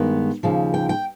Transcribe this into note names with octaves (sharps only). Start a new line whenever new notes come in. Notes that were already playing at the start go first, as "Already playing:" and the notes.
Already playing: G2 D#3 G#3 B3
D#2 C#3 F3
G5
G5